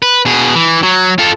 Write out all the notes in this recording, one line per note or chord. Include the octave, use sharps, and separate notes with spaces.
B4
B2 G#4
E3
F#3
F4 A4